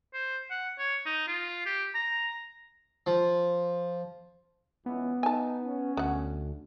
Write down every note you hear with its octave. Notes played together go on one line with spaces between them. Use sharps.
C5
F#5
C#5
D#4
F4
G4
A#5
F3
C#2 E3 B3
D#4 G#5 A5
C#4
D2 B3 F#5